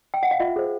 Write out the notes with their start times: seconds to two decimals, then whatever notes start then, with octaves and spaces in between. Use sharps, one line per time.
0.14 G5
0.23 F#5
0.31 F5
0.40 F4 E5
0.56 G#4 C5